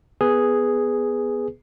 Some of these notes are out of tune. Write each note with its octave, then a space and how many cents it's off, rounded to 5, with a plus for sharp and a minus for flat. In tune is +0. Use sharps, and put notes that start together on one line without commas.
B3 +0 G#4 +0 B4 +0